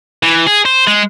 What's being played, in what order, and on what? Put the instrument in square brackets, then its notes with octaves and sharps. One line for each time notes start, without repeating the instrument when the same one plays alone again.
[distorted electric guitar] E3
G#4
C5
G#3